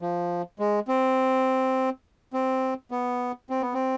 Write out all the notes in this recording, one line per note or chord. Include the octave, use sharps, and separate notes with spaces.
F3
G#3
C4
C4
B3
C4
B3
C4